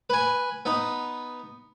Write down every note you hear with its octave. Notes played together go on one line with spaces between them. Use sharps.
B4 G#5
B3 D#4